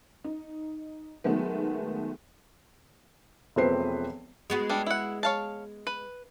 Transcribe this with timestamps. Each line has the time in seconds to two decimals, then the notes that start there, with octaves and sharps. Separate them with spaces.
0.24 D#4
1.24 D#3 F#3 G#3 A3 B3
3.56 E1 F3 A3 C4 B4 C7
4.50 G#3 B3 F#4
4.69 G3 D4
4.86 E4 F#5
5.23 C#5 F5 A5
5.87 B4